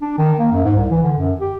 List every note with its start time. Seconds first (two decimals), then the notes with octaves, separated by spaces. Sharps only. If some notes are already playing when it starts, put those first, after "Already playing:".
0.02 D4
0.18 D#3
0.39 A#3
0.52 F#2
0.64 G#2
0.76 C2
0.90 E3
1.03 D3
1.18 F#2
1.40 G4